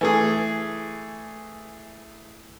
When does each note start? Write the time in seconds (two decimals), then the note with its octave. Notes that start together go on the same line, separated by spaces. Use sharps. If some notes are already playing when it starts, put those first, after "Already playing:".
0.01 E3 A3 G#4